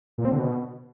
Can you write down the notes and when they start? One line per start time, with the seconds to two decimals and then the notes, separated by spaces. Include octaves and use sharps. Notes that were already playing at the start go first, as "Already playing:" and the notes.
0.18 A#2
0.25 C4
0.32 D3
0.39 B2